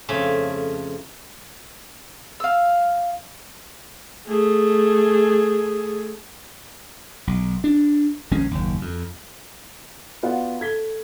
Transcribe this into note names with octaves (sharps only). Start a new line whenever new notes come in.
F2 C#3 A3 E5 A5
F5 E6
A3 G#4
B1
D4
A#1 D#3 G#3 C#4
F#1 D#2
F2
B3 F4 F#4 D5 F5 F#5
A4 G#6 B6 G7